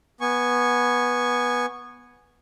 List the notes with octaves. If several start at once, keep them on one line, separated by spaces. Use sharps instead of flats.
B3 G#5 C#6